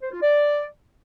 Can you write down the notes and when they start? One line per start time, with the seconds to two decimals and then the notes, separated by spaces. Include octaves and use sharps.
0.02 C5
0.12 F4
0.22 D5